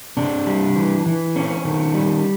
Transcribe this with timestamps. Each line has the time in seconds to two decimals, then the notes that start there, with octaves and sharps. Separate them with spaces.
0.17 C3 D4
0.47 G3
0.76 E3
1.06 E3
1.36 C4 C#4
1.65 D#3
1.94 G3